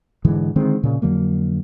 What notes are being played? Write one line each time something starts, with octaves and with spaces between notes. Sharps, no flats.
G#2 D3 E3 G#3
D3 D#3 G#3 C4
A#2 C#3
F2 D3 F#3 A#3